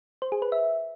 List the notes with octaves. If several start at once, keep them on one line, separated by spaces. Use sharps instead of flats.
C5
G#4
B4
E5